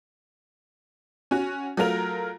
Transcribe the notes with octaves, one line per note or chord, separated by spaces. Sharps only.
C#4 F#4
F#3 A3 F4 A#4 F7